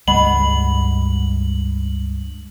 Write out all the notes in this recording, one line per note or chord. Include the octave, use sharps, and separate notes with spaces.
C#2 G2 G#3 D#5 F#5 B5 F#7